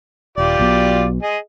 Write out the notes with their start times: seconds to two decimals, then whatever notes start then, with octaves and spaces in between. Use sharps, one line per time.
0.37 D#1 F4 G4 D5
0.59 B1 B2
1.23 G#4 D#5